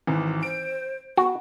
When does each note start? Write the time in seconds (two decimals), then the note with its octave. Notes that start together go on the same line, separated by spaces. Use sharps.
0.07 G#1 E3
0.43 C5 D7
1.17 B3 F#4